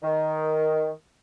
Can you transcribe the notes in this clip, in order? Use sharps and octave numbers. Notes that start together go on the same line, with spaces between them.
D#3